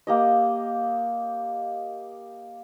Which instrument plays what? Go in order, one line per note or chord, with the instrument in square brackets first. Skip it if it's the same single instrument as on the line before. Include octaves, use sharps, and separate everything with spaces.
[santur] A#3 G4 D#5